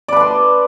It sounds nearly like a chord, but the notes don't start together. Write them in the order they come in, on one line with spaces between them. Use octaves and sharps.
D5 B4 A5 C6